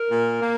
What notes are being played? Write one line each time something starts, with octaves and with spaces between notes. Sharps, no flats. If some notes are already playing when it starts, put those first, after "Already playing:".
Already playing: A#4
A#2
A#3